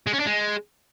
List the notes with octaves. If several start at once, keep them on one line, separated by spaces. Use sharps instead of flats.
G#3
C#4
D4
G#3